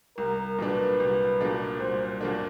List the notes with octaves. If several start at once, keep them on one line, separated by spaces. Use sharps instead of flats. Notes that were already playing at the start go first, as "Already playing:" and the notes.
C2 A#4
A#2 F#3 A#3 D4 B4
C2
A#2 F#3 A#3 D4
C2 C5
A#2 F#3 A#3 D4